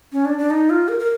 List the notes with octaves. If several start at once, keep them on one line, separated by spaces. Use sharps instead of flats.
C#4
D4
D4
D#4
F4
A#4
A#4